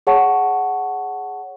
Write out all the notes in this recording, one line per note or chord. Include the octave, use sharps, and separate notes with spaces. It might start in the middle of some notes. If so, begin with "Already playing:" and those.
G#4 C#5 F#5 A5 C#6